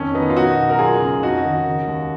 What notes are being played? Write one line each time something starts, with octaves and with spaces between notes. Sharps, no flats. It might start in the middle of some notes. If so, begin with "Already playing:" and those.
Already playing: F2 D#3 C#4
D#3 B3 D#4
F4
B2 D#4 F#4
B1
A#4
F#2 F4 G#4
C#3
F2 D#4 F#4
D#3
C#3
D#2